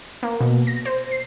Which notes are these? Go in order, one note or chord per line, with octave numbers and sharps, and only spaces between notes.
A#3
B2
A#6
C5
C7